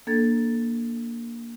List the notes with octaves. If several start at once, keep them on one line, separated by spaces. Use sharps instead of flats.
A#3 D4 A4 G#6 A6